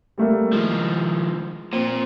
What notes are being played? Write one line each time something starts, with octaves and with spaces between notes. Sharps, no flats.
G3 A3 A#3
D#3 F3 G#3
A#2 C4